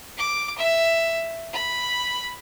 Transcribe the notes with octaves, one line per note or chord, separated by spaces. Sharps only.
D6
E5
B5